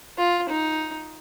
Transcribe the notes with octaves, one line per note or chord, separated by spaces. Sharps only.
F4
D#4